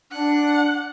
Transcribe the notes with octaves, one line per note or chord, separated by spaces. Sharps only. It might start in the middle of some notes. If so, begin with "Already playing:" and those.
D4 F#5